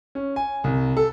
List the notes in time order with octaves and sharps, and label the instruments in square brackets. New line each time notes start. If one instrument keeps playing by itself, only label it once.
[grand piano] C#4
G#5
C2
A4